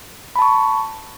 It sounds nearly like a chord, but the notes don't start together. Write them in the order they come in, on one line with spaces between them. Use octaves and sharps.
B5 A5 C#6